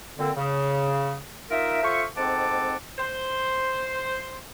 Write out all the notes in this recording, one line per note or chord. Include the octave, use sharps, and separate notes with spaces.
A#2 D3 C4
C#3
D#4 F4 A#4 E5
F4 A4 C5 E5 C#6
F2 G#2 C4 F#5 A5 D6
C5